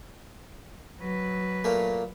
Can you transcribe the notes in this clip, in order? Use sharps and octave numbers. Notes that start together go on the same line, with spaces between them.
F#3 B4
A#2 A3 A#3